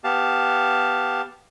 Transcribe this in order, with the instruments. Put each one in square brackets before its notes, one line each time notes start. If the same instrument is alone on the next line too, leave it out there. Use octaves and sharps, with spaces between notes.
[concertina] B3 G4 F5 A5